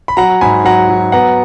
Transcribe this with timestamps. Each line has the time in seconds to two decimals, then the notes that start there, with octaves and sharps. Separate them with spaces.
0.08 B5
0.17 F#3 F#5 A#5
0.41 G#2 G#5 B5
0.65 F#3 F#5 A#5
0.90 F#3
1.12 B3 F#5 A#5